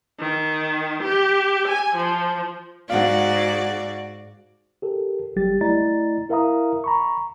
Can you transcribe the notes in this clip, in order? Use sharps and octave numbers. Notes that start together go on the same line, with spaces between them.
D#3
G4
G#5
F3
G#2 F#4 D5 F5 F#5
G4 A4 A#4
G1 F#3 G3 G4 A6
A3 E4 D5 D#5 A#5 A6
E4 A#4 E5 F5 A#5 D#6
A#5 B5 C#6